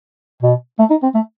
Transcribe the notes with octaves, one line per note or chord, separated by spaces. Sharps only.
B2
A3
D#4
C4
A3